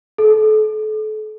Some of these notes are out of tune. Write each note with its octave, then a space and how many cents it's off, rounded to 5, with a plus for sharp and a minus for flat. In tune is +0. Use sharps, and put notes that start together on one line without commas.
A4 -35